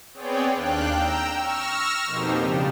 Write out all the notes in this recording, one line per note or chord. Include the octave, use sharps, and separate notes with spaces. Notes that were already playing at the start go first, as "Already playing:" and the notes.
B3 C4 G#4 C#5 D5 G5
D#2 D4 F5 G5 F#6
G5 A#5 E6
C#6 E6 F6 A#6
F2 B2 A#3 D#4 G4 C5
C#3 F3 G3 D4